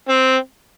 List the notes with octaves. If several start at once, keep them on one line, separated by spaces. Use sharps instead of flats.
C4